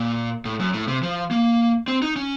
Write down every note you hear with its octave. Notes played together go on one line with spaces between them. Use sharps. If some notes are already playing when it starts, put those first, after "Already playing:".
Already playing: A#2
A2
F#2
A2
C3
F3
A#3
C4
D#4
C#4